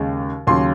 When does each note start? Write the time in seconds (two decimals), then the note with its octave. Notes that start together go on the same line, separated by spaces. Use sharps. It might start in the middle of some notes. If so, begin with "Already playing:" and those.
Already playing: D#2 C#3 G#3
0.47 D#2 C#3 F#3 C6